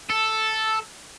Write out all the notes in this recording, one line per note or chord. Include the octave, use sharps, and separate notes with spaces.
A4